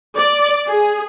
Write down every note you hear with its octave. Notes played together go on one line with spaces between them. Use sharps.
D5
G#4